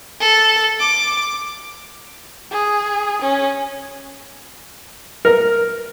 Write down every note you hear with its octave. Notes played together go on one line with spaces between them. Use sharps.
A4
D6
G#4
C#4
A#4